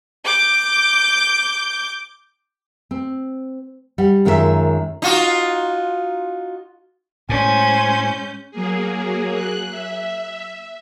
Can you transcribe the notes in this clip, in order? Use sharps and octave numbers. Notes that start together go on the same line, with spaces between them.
D6 G6
C4
G3 F#5
F#2 D#3 G#3 E4 F4 E5
D#4 F4 F#4
A2 G#3 C#4 C5 G#5 G6
F#3 A#3 G#4
F#6
E5